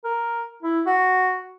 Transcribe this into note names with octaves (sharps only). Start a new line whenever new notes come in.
A#4
E4
F#4